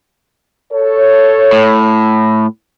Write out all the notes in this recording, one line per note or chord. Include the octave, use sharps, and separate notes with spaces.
A4 C#5
A2